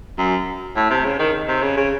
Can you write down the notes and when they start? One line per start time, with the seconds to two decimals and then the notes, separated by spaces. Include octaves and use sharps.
0.18 F#2
0.76 A2
0.90 C3
1.05 C#3
1.19 D#3
1.48 C3
1.62 C#3
1.77 C#3